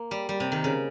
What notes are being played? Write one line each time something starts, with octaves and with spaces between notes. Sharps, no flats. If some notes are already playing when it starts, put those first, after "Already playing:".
Already playing: A#3
G3
G3
C3
D#3
C#3